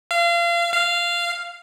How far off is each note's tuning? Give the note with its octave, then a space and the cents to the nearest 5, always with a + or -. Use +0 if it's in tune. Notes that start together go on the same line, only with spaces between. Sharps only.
F5 -30
F5 -10